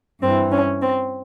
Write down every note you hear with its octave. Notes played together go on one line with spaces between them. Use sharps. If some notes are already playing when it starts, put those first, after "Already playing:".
G2 E3 C4
C#4
C4